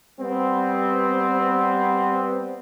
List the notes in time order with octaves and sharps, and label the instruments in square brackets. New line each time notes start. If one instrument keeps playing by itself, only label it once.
[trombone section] G3 B3 C4